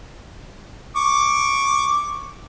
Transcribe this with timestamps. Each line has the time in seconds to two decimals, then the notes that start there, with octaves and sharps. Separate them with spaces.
0.96 C#6 D6